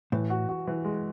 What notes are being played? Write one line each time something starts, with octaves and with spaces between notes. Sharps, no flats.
A2 E3
F#4
F#4
E3
G#3